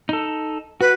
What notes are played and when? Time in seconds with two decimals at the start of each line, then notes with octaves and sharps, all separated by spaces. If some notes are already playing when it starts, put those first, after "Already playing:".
0.09 D#4 A4
0.81 F#4 B4